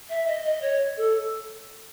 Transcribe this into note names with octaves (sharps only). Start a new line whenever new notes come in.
E5
D#5
D#5
C#5
A4